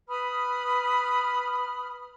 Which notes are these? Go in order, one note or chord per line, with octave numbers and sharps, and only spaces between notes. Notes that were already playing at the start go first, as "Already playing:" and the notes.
B4 B5 D#6 F6